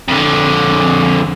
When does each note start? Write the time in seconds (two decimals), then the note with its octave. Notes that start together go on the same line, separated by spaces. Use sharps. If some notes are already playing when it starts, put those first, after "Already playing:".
0.08 F2 D3